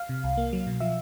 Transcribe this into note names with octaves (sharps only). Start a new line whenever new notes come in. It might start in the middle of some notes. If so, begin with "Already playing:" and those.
Already playing: F5
C3
C2
A#3
F#3
B2
F3 E5